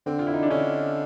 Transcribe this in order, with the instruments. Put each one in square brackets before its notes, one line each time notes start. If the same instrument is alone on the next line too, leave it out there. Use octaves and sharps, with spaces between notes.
[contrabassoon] D3 [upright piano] C4
[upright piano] F4
E4
D#4
D4
[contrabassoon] D3 [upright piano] C#4